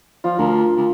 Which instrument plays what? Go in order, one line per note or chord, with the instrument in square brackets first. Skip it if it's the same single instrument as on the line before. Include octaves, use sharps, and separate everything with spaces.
[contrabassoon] F3 [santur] F4
[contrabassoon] D2 [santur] A#4
[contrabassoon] D2